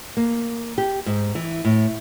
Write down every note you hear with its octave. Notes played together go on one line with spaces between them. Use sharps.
A#3
G4
G#2
E3
A2